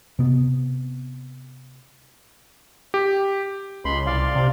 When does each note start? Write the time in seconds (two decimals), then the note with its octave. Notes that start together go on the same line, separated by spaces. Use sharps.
0.19 C3 B3
2.94 G4
3.85 C#2 B5 C6
4.07 C2 D5 F5 C6
4.35 C3